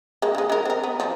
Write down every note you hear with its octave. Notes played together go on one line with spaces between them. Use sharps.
G#3 A#3
D3 G#3
G#3 A#4
C4 A#4
B3
F3